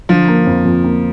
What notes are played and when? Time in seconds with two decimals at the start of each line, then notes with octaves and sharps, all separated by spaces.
0.09 D3 F3
0.28 A#3
0.47 F2
0.65 F2
0.84 A#3